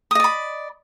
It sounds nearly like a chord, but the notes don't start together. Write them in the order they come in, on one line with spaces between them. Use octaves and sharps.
D#6 D#5 D5 B5